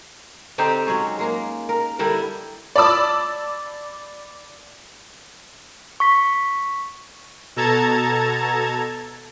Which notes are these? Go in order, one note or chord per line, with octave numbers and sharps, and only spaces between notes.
D3 C4 D#4 G4
F#3 G#3 C#4
G#3 A#3 A#4
A#4
D3 G3 E4 A#4
D5 A5 B5 D6 E6
C#6 B6
B2 A4 A5 A#5 G#6